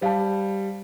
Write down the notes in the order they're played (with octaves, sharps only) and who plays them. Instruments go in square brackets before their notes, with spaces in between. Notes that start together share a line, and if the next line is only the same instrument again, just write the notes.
[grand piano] G3 [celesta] C5 F5 A5